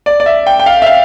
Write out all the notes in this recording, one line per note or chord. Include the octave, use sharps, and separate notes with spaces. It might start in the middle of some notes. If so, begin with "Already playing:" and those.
D5
D5
E5
G5
G5
F5
E5
F5